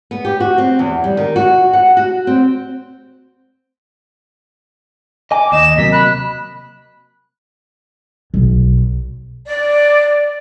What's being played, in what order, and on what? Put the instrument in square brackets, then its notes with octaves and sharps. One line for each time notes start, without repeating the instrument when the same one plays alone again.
[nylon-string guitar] B3
G4
F#4
C4
E2
G3
D#3
F#4
F#5
F#4
C4
[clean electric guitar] D#5 G#5 [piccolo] D6
[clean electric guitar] D#2 [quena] D#5 [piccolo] E7
[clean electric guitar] C3 F#3 A#3 [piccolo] B6
[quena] B5 [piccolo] F#6
[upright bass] B1
[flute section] D5